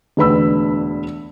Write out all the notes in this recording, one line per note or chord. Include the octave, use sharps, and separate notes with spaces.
E1 D2 B4 B5 E6